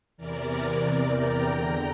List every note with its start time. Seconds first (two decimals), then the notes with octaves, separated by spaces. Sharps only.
0.17 E2 C3 E3 A#4 D5
0.79 A#4 D5
1.10 G5 A#5
1.40 E2 D3 G5 A#5